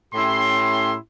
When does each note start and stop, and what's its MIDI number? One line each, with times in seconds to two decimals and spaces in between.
0.14 0.95 45
0.14 0.95 61
0.14 0.95 64
0.14 0.95 67
0.14 0.95 84